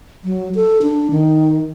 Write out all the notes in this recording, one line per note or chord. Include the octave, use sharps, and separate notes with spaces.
F#3
A4
D4
D#3